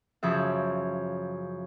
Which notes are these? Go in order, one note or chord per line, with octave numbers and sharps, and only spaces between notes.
F#2 C#3 F3 E5